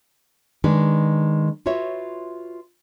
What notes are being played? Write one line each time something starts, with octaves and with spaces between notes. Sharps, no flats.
D#3 G#3 D4 B4
F4 F#4 B4 C#5 E5